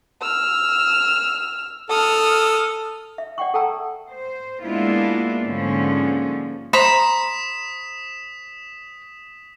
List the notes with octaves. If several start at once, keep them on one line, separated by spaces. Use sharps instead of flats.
E6 F6
A4 D#6 F6
E5
D5 F#5 G5 C#6
A4 F#5 G5 A5 A#5 E6
C5
G#3 A#3 B3 D4 E4 F4
G#2 D3 F3 G#3 A#3 C#4
C5 A#5 B5 D#6 B6 E7